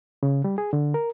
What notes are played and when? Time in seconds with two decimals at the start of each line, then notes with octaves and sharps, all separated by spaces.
0.23 C#3
0.44 G3
0.58 G#4
0.73 D3
0.94 A#4